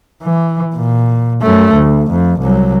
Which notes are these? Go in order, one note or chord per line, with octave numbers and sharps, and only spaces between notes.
E3
A#2
F#2 A3
D2
F2
C2 F#3